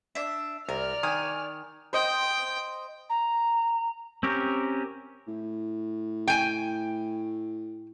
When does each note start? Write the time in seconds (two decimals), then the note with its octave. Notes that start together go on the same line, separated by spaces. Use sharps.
0.15 D4 E5
0.69 C2 A#4 D5 F6
1.03 D#3 G#5
1.93 C5 D#5 G5
3.09 A#5
4.23 C4 C#4 G4 A#4
5.28 A2
6.28 G5 G#5